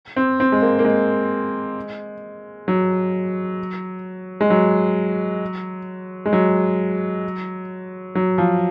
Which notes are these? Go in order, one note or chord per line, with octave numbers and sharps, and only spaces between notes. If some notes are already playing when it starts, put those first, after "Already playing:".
C4
C4
G#3
A#3
A#3
G#3
F#3
G#3
F#3
G#3
F#3
F#3
F3